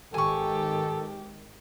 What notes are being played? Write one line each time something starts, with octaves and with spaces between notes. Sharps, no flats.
G#1 G#2 D#3 G4 A4 G#5 C#6